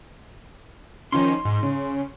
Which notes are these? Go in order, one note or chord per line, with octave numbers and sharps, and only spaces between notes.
D#3 F3 C#4 C6
G#2
C#3